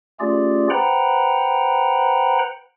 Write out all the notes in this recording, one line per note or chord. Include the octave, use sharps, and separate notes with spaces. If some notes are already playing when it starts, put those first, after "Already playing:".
A3 C#4 F4 G4 G#4 D5
B4 C5 F#5 G5 A#5 B5